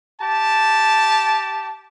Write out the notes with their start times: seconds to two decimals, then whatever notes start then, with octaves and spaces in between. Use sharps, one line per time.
0.21 G4 A5